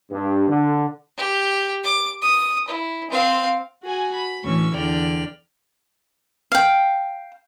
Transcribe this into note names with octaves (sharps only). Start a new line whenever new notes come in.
G2
D3
G4
D6
D#6
E4
C4 F5
F#4 G#4 G#5
B5
D2 A2 E3 C#4 C#6 E6
E2 D3 E4 D5 G5 F6
F5 G5